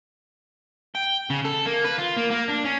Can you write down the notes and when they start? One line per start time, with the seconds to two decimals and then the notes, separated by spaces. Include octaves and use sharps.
0.95 G5
1.30 C#3
1.44 A4
1.65 A#3
1.84 B4
1.98 F4
2.16 A#3
2.30 A#3
2.48 D4
2.64 C#4